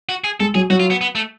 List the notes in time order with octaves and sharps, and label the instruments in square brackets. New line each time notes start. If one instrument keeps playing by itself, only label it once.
[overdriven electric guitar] F#4
G#4
[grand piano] G#3 [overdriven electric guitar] A4
[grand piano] F#3 [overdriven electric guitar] G#4
[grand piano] F#3 [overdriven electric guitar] F#4
[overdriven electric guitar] F4
B3
B3
A3